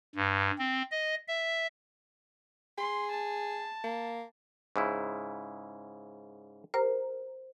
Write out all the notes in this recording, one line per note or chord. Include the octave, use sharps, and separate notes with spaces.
G2
C4
D#5
E5
G#4 C6
A5
A#3
G#2 C#3 E4
G4 A#4 C5